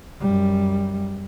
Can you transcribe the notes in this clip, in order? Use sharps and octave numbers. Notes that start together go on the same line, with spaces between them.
F#2 G3